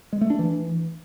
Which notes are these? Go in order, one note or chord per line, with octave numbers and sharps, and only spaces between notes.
G#3
A3
D4
E3